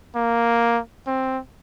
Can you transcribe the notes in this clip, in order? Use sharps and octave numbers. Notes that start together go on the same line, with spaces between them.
A#3
C4